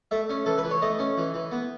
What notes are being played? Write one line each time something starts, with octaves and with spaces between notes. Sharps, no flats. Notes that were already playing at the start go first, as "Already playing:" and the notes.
A3 E5
C#4
E3 A4
B4
E3
C#5
A3 D#5
C#4
E3
E3
B3